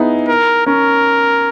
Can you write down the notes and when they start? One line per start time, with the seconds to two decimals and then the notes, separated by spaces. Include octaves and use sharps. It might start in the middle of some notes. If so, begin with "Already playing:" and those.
Already playing: B3 D#4 E4 G#4
0.28 A#4
0.66 C#4 A#4